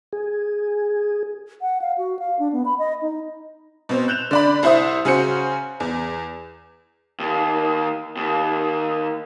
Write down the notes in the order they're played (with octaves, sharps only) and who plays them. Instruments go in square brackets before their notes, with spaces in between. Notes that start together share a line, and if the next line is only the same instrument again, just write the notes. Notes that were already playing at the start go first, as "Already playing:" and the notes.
[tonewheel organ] G#4
[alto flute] F#5
F5
F#4
F5
D4
B3
B5
D#5
D#4
[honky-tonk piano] B2 C4 C5
F#6 G6 E7 F7
D3 D5 B5
C2 E4 C5 E5 D#6
C#3 C#4 F#4 C5 C#7
E2
[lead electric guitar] D#2
D#2